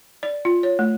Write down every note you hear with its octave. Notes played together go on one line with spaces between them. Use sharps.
D5
F4
C#5
A3